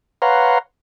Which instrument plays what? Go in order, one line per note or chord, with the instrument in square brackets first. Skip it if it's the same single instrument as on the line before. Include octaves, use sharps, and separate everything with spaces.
[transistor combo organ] B4 C#5 F5 F#5 A#5 C6